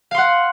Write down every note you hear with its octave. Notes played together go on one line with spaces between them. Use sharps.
F5 F#5 C6